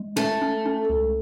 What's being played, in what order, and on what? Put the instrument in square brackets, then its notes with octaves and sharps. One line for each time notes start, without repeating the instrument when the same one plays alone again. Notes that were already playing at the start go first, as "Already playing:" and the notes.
Already playing: [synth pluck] G#3
[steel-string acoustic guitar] A3 [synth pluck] C#4
[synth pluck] C#4
C#4
C#2